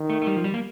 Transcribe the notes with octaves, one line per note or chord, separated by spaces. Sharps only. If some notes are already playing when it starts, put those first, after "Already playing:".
Already playing: D#3
A3
A3
G3
F3
G3
A#3